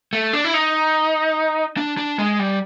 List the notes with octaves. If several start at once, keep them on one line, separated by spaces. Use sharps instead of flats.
A3
D4
E4
D#4
D4
D4
G#3
G3